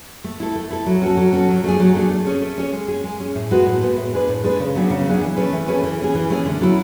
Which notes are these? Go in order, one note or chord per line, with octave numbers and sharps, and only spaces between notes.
A3
E4 A4
A3
E4 A4
F#3
C#4 F#4 A4
F#3
C#4 F#4 A4
F#3
A3 D4 G#4
F#3
A3 D4 G#4
A3
C#4 G#4 C#5
A3
C#4 G#4 C#5
G#3
C#4 G#4
G#3
C#4 G#4
A2
G#3 B3 F#4 B4
A2
G#3 B3 F#4 B4
A2
G#3 D4 G#4 B4
A2
G#3 D4 G#4 B4
C#3
F#3 B3 D4 G#4
C#3
F#3 B3 D4 G#4
E3
A3 C#4 G#4 B4
E3
A3 C#4 G#4 B4
E3
A3 C#4 G#4
E3
A3 C#4 G#4
D3
F#3 C#4 E4